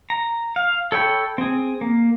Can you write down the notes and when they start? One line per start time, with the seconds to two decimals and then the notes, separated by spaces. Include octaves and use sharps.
0.10 A#5
0.56 F5
0.92 A4 C#5 G5 B5
1.38 C4 G#4
1.81 A#3